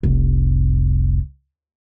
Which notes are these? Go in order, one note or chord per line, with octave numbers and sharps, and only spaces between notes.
F1 C2